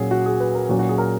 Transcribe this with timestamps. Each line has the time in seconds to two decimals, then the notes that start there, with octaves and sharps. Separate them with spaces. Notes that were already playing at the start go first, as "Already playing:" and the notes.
Already playing: A#2 F#3 C#4 F#4 G#4
0.11 F#4
0.26 G#4
0.40 B4
0.55 A#4
0.69 A#2 F#3 C#4 F#4
0.79 F#4
0.89 G#4
0.98 A#4